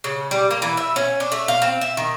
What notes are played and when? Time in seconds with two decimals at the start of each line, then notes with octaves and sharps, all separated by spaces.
0.04 C#3
0.31 G3
0.51 A#3
0.62 E3
0.77 E5
0.96 C#4
1.20 D4
1.32 A3
1.48 F5
1.62 C4
1.81 E5
1.97 D#3